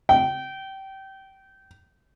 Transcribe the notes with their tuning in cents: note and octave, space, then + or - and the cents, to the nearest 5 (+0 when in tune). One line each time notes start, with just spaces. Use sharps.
G5 -25